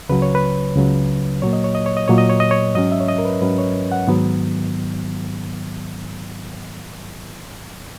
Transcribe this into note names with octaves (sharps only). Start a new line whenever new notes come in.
C#2 C#3 F#3 B4
C#5
B4
C#2 C#3 F#3
A#2 F#3 A#3 C#5
D#5
C#5
D#5
C#5
D#5
A#2 F#3 A#3 C#5
D#5
C#5
D#5
C#5
G#2 F#3 C#4 D#5
E5
C#5
D#5
A#4
B4
G#2 F#3 C#4 B4
C#5
F#5
G#2 D#3 F#3 B3